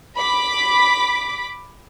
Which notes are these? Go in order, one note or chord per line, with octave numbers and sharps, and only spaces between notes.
B5 D6 B6